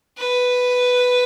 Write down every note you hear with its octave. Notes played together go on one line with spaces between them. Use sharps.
B4